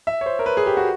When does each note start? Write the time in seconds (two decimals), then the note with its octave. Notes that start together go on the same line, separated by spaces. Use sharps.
0.07 E5
0.21 C#5
0.26 C5
0.39 A#4
0.46 B4
0.57 G#4
0.66 G4
0.77 F#4